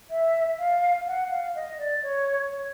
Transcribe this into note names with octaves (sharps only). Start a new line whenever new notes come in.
E5
F5
F#5
F5
D#5
D5
C#5
C#5